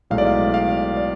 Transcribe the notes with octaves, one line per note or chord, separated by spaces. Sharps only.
B1 A2 G#3 F5
D5
F5
F5
D5